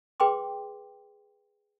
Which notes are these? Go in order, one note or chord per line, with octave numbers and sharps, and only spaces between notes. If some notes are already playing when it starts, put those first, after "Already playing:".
G#4 B4 G5 C6 D6